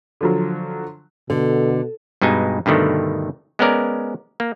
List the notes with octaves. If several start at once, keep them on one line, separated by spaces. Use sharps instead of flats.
D3 F3 F#3
B2 D3 A4
G2 B2 G#3 D#4 G#5
G2 B2 D3 D#3 A3
G#3 B3 C#4 A#4 D5
A#3